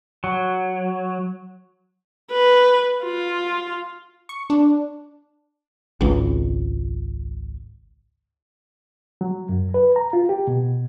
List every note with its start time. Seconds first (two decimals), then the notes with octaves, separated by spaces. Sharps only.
0.24 F#3
2.31 B4
3.04 F4
4.29 C#6
4.50 D4
6.01 G#1 C#2
9.21 F#3
9.49 F#2
9.74 B4
9.96 A#5
10.13 F4
10.29 G4
10.47 B2